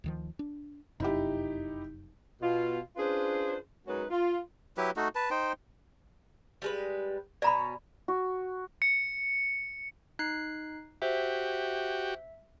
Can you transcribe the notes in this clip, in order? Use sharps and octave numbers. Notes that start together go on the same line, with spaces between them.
D2 D#3 F3
D4
F1 F#2 C3 D#4 E4 G4
B2 F4
C#4 D4 F4 G#4 B4 C5
F#2 G#3 C#4 D#4 F#4 B4
F4
F#3 E4 G4 B4
A3 D#4 F#4
B4 A5
D#4 C5 G5
G3 G#3 B4
B2 C#4 D5 A#5 B5
F#4
C#7
D#4 F#6 C7
F#4 G4 C5 E5